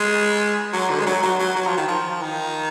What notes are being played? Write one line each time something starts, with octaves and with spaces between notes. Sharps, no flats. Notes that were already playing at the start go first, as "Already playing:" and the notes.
Already playing: G#3
F#3
D3
G#3
F#3
F#3
F#3
F#3
F3
D#3
F3
D#3